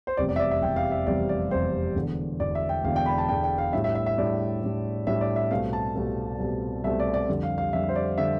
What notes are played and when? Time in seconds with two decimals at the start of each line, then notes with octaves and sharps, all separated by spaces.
0.07 C5
0.17 F1 E2 C3 G3 C4 D5
0.29 D5
0.36 E5
0.40 D5
0.51 E5
0.61 F1 E2 C3 G3 C4 G5
0.76 F5
0.91 E5
1.07 F1 E2 C3 G3 C4 D5
1.29 D5
1.51 F1 E2 C3 G3 C4 C5
1.95 E1 E2 D3
2.39 E1 E2 D3 D5
2.55 E5
2.69 G5
2.84 E1 E2 D3 F5
2.96 G5
3.06 B5
3.18 A5
3.29 E1 E2 D3 G5
3.44 G5
3.58 F5
3.73 A2 G3 D4 E5
3.84 E5
3.95 E5
4.06 E5
4.18 A2 G3 D4 D5
4.62 A2 G3 D4
5.07 A2 G3 D4 E5
5.21 D5
5.36 E5
5.51 C2 B2 A3 C4 F5
5.73 A5
5.95 C2 B2 A3 C4
6.39 C2 B2 A3 C4
6.84 C2 B2 A3 C4 E5
7.00 D5
7.14 D5
7.28 F2 D3 G3
7.43 F5
7.58 F5
7.73 F2 D3 G3 E5
7.89 C5
7.96 D5
8.18 D3 G3 E5